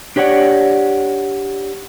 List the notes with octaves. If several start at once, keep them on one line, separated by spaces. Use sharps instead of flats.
D4 G4 C#5 D5 F#5